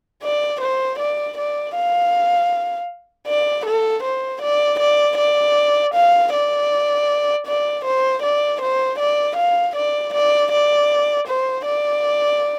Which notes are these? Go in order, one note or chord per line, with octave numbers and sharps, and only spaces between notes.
D5
C5
D5
D5
F5
D5
A4
C5
D5
D5
D5
F5
D5
D5
C5
D5
C5
D5
F5
D5
D5
D5
C5
D5